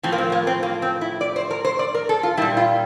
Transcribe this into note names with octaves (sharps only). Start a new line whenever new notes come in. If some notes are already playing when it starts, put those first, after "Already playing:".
A2 F3 C4
A#3
C4
A#3
C4
A#3
C4
E4
D5
C5
A#4
C5
D5
A#4
A4
F4
A#2 G3 E4
F4